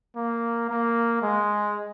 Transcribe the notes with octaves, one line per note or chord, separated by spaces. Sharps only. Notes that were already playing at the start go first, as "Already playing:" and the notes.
A#3
A#3
G#3